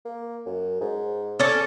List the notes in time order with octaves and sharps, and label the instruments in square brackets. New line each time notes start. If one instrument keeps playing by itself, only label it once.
[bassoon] A#3
F#2
G#2
[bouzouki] C#4 D4 A4